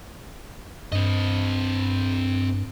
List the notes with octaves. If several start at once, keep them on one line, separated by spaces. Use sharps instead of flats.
G2 C4 D#5